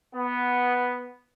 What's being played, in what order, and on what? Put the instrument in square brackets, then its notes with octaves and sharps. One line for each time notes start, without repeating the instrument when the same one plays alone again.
[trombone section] B3